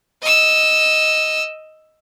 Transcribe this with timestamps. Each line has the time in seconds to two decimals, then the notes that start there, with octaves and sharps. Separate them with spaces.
0.22 D#5 E6